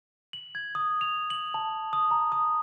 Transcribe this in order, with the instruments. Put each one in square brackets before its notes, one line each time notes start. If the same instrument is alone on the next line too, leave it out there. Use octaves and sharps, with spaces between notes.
[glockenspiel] F#7
G#6
D#6
F7
F#7
A5
D#6
A#5
D#6